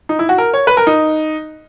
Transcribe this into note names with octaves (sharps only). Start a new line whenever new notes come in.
D#4
E4
F#4
A#4
C#5
B4
A#4
D#4